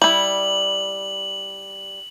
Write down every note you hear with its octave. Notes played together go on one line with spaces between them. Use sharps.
G3 E4 F#7